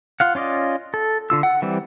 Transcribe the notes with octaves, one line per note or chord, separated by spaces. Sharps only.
F4 F5 F#5
C#4 F4 D5 D#5
A4
D3 F4 E6
F#5
E3 G3 C4 D5